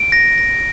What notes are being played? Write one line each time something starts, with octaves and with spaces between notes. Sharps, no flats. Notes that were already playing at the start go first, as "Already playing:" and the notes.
Already playing: D7
A#6
A#6